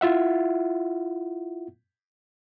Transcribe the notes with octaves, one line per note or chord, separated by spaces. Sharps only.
E4 F4 E5 F#5